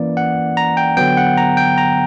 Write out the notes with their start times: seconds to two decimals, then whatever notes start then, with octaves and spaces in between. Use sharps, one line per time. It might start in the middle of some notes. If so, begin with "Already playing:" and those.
Already playing: E3 A#3 C#4 D5
0.17 F#5
0.57 A#5
0.77 G5
0.97 D3 F#3 B3 G5
1.17 F#5
1.37 A#5
1.57 G5
1.78 A#5